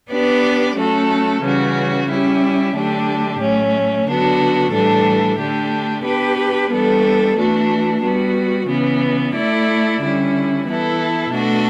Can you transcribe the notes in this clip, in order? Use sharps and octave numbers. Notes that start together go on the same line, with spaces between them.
B3 D4 G4 B4 D5
F#3 A3 C#4 F#4 A4
C#3 E3 G3 C#4 F#4
G3 C#4 E4 G4
D3 F#3 A3 D4 G4
A2 F#3 A3 C#4
D3 F#3 B3 D4 F#4
A2 E3 G3 D4 A4
D3 A3 D4 G4
B3 D4 G4 B4
E3 G3 B3 D4 A4
E3 A3 D4 F#4
G3 B3 F#4
C#3 E3 B3
A3 E4 A4 D5
D3 G3 C#4 E4
E3 B3 E4 A4
B2 A3 D4 F#4 A4